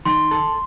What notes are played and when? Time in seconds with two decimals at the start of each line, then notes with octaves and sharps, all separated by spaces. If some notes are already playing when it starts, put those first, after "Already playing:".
0.05 D#3 C6
0.31 A4